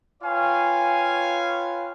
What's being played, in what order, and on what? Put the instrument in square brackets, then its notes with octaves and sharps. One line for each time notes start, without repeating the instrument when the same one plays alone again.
[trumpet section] F4 B4 C#5 F5 G5 G#5